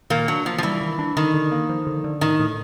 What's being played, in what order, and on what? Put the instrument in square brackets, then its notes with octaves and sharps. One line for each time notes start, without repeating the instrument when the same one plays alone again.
[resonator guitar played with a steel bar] A#2 A#3 [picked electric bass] D#3
[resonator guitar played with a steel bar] F#3 [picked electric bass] D4
[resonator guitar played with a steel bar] F3 [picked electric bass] A#3
[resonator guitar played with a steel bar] F3
[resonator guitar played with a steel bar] E3 [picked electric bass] G3
[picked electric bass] D#3
D4
[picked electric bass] D3 [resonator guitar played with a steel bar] D#3
[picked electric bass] D3
A#3
F3
D3
D3
[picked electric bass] A2 [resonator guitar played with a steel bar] D#3
[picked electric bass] A2